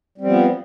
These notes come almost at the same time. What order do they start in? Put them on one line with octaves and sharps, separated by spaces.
G3 C4 F3 B3